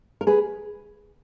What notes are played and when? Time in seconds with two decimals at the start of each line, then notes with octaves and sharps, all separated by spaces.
0.21 A#4
0.27 G#4 B4